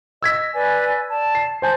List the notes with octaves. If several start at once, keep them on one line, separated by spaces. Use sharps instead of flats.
D#5 E6 G#6 B6
B4 D5 G#5
D5 A5
C7
C5 G#5 A5 G6